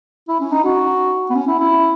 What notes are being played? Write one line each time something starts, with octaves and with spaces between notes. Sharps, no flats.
E4
C#4
D#4
F#4
B3
C#4
E4
E4